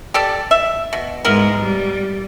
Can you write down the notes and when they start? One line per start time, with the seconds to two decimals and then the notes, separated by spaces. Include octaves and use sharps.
0.14 G4 A4 D5
0.51 E5
0.93 B2
1.25 G#2 G#3 B3 E4 A#4
1.60 G3